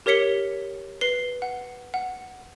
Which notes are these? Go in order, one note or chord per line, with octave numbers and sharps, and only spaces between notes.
G4 A#4 C#5 B6 C#7 G7
B4 C7 G7
F#5
F#5